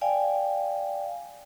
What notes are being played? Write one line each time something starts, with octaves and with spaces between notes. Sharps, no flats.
D5 F5 G5 G#5